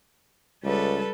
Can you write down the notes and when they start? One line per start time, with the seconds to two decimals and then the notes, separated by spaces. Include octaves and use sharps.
0.63 C#2 G3 A4 B4